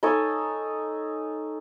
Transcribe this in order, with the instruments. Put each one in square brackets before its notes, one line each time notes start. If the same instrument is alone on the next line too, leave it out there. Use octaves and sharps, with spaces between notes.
[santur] D#4 A4 C#5 G#5